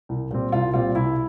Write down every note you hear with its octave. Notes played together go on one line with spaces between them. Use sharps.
C2
A#2 G3 C4
C2 F4
A#2 G3 C4 F4
C2 E4